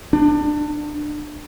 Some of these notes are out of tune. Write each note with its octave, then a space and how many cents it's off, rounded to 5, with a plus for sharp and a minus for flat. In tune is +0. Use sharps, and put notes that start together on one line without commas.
D4 +25